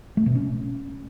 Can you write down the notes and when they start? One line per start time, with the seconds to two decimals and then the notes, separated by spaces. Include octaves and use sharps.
0.17 A3
0.26 B2
0.35 C#4